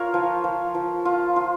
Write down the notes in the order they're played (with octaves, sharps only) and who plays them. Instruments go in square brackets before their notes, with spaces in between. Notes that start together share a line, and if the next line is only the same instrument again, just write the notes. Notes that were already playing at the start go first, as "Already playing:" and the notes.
Already playing: [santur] F4 A#4 C#5
F3
F3
F3
F4
F4